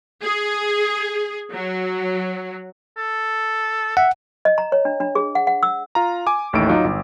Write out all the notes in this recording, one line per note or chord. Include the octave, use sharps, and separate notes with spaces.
G#4
F#3
A4
E5 F#5
D#5
A#5
C#5
D4
D4
G#4
F#5
F#5
E6
F4 A#5
G#5 D6
A1 D#2 A2 D#4 E6 D7
F#3 D#4 F4
G1